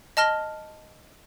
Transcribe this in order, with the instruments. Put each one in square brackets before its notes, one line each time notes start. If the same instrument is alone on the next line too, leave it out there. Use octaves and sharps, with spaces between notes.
[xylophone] D#5 A5 F6 A#6 G7